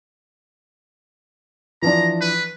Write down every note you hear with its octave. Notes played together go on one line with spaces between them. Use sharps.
E3 F3 D4 A#5
B4